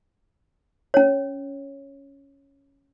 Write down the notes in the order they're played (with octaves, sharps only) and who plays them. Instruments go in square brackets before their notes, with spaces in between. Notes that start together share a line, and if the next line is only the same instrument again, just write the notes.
[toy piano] C#4 C#5